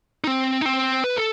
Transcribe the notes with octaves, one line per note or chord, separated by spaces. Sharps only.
D#4
C4
D#4
C4
B4
A4